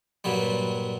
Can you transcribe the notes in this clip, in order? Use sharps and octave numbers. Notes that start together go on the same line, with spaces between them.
G2 A#2 F#3 G3